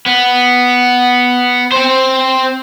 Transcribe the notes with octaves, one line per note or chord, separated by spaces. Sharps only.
B3
C4 C5